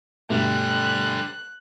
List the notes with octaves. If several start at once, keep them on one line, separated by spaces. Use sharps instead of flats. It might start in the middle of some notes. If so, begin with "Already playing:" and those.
G2 B2 D3 G3 A3 F#6